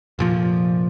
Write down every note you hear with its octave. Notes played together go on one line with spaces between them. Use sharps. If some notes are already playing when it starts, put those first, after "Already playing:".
F1 A#2 F3